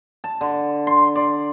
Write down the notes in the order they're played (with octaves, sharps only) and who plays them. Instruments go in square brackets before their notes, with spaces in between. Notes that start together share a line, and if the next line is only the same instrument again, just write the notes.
[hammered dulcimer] A5
D3
C6
D5